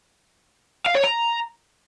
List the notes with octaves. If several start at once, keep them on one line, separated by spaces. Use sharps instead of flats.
F5
C#5
A#5